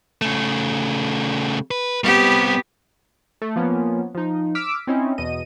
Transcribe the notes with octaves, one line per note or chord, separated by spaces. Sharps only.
C#3 A3
B4
G3 B3 C4 G4
A3
F3 A#3 B3 C#4
F3 D#4
D6 E6 F6 B6 D7
C4 C#4 D#4 E4
E2 B2 D#5 D#7